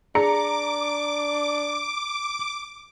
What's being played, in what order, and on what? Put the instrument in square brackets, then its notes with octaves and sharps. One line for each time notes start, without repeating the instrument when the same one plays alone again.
[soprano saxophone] D4 [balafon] G#4 [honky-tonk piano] A#5 C#7 [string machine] D6